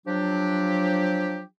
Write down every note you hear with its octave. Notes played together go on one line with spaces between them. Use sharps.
F3 F#3 D4 G4